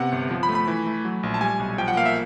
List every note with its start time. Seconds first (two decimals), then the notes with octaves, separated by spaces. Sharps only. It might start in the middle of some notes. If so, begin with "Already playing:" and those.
Already playing: C3 B3 F#5
0.12 G1
0.31 F3
0.43 B5
0.49 A3
0.55 B5
0.68 E3
0.86 A3
1.05 F#3
1.23 A#1
1.34 A5
1.41 G3 G#5
1.59 B1
1.78 F3 G5
1.88 F#5
1.97 A#3 F5
2.06 E5